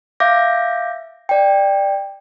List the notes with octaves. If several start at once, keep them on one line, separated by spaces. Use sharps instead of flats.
E5 F5 D6 G6 A#6
D5 G5